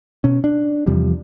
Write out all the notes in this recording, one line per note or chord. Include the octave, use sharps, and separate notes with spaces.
B2 C#4
D4
E2 C3 F3 G3